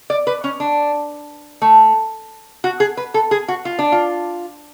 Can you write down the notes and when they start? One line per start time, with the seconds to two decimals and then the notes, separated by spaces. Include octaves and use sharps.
0.10 D5
0.27 B4
0.44 C#4
0.60 D4
1.62 A3
2.64 F#4
2.80 G#4
2.97 B4
3.14 A4
3.31 G#4
3.48 F#4
3.65 F4
3.79 D4
3.92 F4